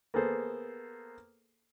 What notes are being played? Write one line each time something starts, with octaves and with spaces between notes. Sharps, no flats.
A#3 B3 G#4 A4 C5